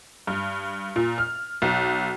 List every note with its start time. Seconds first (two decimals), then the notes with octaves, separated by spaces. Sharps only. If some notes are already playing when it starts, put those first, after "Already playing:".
0.27 G2
0.96 A#2
1.18 F6
1.62 B1